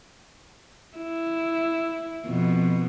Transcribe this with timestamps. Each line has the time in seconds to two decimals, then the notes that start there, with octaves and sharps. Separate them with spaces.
0.97 E4
2.26 F2 B2